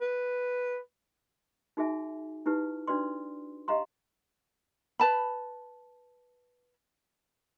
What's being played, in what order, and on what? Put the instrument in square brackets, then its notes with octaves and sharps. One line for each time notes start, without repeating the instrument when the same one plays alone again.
[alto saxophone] B4
[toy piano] D#4 F#4 G#4 E5 G#5
D#4 E4 G4 B4
D4 F#4 B4 D5 C6
G4 D#5 F5 A#5 C6
[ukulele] B4 A5 B5